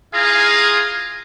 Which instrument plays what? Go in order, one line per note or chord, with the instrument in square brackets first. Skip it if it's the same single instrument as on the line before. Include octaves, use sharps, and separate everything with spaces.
[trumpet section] E4 F4 G#4 F5 G#5 A#5